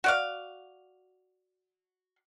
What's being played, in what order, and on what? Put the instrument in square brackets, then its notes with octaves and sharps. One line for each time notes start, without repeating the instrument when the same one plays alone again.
[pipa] F#4 D5 F5